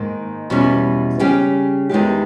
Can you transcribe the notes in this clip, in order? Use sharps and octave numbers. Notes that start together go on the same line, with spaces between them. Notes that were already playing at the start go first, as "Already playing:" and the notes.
Already playing: G#2 D#3 A#3
E2 B2 G3 C#4
C#3 G3 C#4 G4
E2 D#3 G#3 D#4 G4